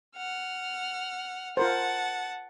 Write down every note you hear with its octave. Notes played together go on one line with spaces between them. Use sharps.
F#5 F6
F4 A#4 C5 F#5 A5